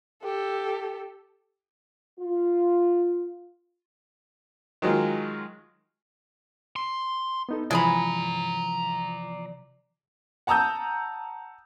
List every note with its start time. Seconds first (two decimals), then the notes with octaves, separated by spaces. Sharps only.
0.23 G4 A4
2.20 F4
4.82 D#3 F#3 G#3 F4
6.76 C6
7.49 B3 D#4 A4
7.71 C3 E3 F3 G#3 G#4 D5 A#5 B5
10.47 F#5 A5 A#5 D#6 E6 G6